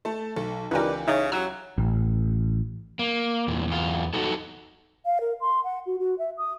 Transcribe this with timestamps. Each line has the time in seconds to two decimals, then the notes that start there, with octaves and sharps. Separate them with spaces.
0.05 A3 A5
0.36 B1 A4
0.71 C#2 E3 D#4 F4 G4 A#4 B4 D5
1.07 C#3 D#4 C#5 E5
1.32 F#3 A#5 E6
1.78 A1
2.99 A#3
3.48 E2 A#2
3.67 E2 F4
4.13 D#4 F#4 A4
5.06 F5
5.21 A#4
5.41 C6
5.64 F#5
5.86 F#4
5.99 F#4
6.19 E5
6.38 D#6